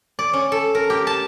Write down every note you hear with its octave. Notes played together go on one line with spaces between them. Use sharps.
D5
C#4
A4
A#4
G4
A5